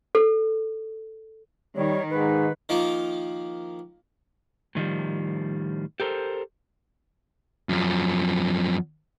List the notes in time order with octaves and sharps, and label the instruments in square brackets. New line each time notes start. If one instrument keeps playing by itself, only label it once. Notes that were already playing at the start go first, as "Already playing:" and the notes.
[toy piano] A4
[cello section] D#3 [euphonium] G3 [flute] C#5
[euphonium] G#2 [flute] B4
[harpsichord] D#3 F3 A#3
[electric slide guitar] A2 D#3 F3 G3
G4 A4 A#4 C5
[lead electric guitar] F#2 F3